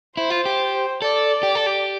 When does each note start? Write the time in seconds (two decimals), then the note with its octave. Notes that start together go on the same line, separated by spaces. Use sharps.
0.17 E4 C5
0.30 F4
0.46 G4
1.01 A4 D5
1.43 G4
1.55 A4
1.66 G4